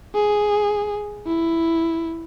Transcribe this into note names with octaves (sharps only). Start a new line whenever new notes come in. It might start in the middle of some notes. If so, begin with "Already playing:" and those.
G#4
E4